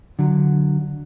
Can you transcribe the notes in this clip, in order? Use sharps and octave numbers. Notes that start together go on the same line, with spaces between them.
D3 F#3